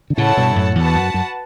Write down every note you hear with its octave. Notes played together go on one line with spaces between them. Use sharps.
D3
A2 C#3 E4 A4 C#5 F#5 A5
G2 B2
F#2 A2
E2 F#4 B4 F#5 A5
F#2
F#2